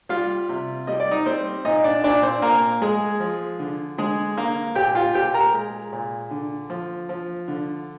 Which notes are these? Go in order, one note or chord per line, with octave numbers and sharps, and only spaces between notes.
G3 F4 F5
C3
G3 D#5
D5
D#4 D#5
G3 C4 C5
A#2 D#4 D#5
D4 D5
A#2 D4 D5
C4 C5
A#2 A#3 A#4
G#3 G#4
F3
D3
D3 G#3 G#4
D3 A#3 A#4
A#2 G4 G5
F4 F5
A#2 G4 G5
A#4 A#5
G#3
A#2
D3
F3
F3
D3